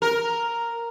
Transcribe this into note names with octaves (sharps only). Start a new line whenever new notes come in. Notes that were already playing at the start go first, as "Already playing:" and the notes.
A#4